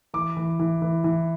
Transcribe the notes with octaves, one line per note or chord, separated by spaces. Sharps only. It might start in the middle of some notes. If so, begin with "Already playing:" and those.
E3 D6
E3
E3
E3
E3